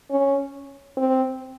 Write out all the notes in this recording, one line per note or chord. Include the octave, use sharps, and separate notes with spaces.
C#4
C4